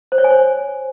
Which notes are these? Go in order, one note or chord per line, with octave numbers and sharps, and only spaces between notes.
C5
C#5
G#5
C5